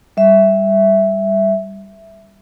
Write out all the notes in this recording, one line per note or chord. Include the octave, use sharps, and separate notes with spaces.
G3 E5